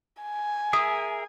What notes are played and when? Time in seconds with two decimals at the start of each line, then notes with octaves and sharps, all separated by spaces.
0.23 G#5
0.73 G#4 A#4 E5 D#6